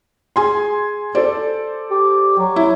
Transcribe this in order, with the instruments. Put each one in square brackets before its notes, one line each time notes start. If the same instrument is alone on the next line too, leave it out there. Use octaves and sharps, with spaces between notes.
[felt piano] G#4 G#5 C6
A4 C5 D5
[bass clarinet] G4
F#3
[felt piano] E4